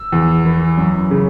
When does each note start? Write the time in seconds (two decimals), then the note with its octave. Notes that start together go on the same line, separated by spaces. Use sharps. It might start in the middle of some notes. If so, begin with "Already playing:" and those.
Already playing: E6
0.12 E2
0.45 E3
0.78 F#2
1.11 C#3